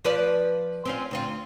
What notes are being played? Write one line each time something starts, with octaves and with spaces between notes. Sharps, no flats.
F3 B4 D5
C4 C#4 F4
D2 C4 F4